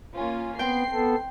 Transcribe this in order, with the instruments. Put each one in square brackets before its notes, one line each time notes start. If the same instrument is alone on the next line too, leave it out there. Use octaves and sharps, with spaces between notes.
[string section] A#3 C#4 F4
[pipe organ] B3 [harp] C4 G5 [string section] C7
[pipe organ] B3 A4